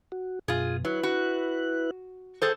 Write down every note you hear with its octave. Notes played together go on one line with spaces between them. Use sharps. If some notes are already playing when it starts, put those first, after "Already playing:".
F#4
F#2 B2 F4 G#4
F#3 E4 B4 F#6
F#4
G#4 A4 C5 G5 G#5